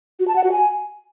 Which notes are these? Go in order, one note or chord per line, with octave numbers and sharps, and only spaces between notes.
F#4
A5
F#5
F#4
G#5